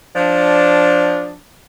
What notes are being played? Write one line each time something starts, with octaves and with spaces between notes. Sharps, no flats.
F3 D4